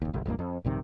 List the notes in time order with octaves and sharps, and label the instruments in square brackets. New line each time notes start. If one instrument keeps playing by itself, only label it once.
[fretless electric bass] F#1 D#2
G1 C2
F1 C#2 G2 A#3
F2
A#1 G2 C3 D#3